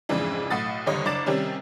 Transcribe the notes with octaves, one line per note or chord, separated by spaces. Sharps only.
F2 G#2 C#3 E3 D4
B1 A2 F#5 D#6 A6
F#1 D#2 D3 G3 C#5 D#5
F#1 D4 D6 A6 E7
C3 D#3 G3 C#4